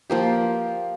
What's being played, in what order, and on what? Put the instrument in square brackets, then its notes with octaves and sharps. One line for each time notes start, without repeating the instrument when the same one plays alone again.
[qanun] F3 A#3 G4